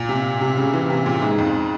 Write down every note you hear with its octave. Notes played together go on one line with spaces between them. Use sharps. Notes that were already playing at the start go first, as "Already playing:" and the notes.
Already playing: A#2
C3
C3
C#3
E3
C3
A#2
G#2
F2